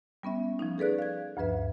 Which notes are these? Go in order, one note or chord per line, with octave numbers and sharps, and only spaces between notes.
G3 B3 C#4 E5
F3 C#4 D#4
G#4 A4 B4 D5 F#6
F5 G#6
D2 G2 F3 B4 E5